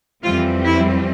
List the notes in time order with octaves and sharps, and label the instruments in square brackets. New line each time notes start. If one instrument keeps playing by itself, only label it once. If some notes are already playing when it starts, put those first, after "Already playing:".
[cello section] F2 E3 G3 C4 F4
E4